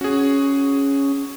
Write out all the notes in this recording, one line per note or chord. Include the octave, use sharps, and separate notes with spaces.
C#4 F#4 G#4